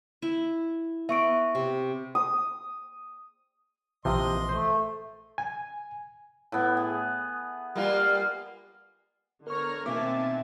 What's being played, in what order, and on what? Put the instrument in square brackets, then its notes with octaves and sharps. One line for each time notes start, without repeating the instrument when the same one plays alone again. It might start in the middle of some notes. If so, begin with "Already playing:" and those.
[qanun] E4
[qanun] B3 [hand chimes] E5 C#6 D7
[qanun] C3
[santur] D#6
[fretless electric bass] A#1 E3 [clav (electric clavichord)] C3 F3 [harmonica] D#5 C6
[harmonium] A3 [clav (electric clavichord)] C5
[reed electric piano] G#5
[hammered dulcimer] A2 B3
G#4
[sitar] G3 A#3 F4
[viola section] D3 B3 C#5 [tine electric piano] A#4 C#6 [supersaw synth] A#5 F6
[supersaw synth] B2 D#3 C4 [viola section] A#3 G#5 A5 [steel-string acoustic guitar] E5 [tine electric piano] D6